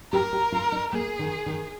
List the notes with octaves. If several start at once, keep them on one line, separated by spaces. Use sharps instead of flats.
G4 A#4
G4
F4
D#4
A#3 G#4
D#3
D#3